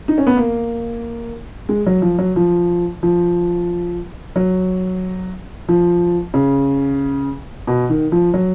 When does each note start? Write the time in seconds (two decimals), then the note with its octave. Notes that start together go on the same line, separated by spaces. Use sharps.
0.08 D#4
0.18 C#4
0.27 B3
0.37 A#3
1.69 G#3
1.86 F#3
2.02 F3
2.18 F#3
2.36 F3
3.03 F3
4.36 F#3
5.68 F3
6.34 C#3
7.67 B2
7.90 D#3
8.12 F3
8.34 F#3